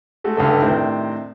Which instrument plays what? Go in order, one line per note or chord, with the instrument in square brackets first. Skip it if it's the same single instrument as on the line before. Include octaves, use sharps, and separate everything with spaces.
[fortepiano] G#3 A3 F#4
C#2 G2 D3 D4 A4
A2 C3 D#3 C4 D4